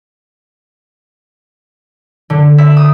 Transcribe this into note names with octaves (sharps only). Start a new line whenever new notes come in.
D3
E5
D#6